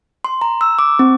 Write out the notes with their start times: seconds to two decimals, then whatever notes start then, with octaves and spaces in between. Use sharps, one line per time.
0.24 C6
0.41 A#5
0.61 E6
0.79 D6
0.99 C4